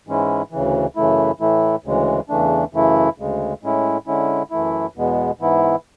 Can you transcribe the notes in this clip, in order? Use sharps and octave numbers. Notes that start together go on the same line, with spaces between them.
G#2 E3 G#3 C#4 E4
D2 C#3 E3
F#2 C#3 E3 A3 E4
A2 E3 A3 E4
D2 C#3 E3 G#3
E2 C#3 E3 A3 D4
F#2 C#3 E3 A3 E4
D2 C#3 G#3
A2 G#3 C#4 E4
D3 G#3 C#4 E4
F#2 E3 A3 E4
E2 B2 G#3 B3
G#2 E3 B3 E4